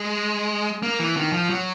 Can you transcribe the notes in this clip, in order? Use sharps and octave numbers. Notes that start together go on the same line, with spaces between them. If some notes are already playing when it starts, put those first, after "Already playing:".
Already playing: G#3
A#3
E3
D#3
F3
F#3